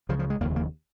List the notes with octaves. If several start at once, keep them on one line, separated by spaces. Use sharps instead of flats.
C#2 C#3 F3
F3
G#3
F1 D#2 C#3 A#3
A#3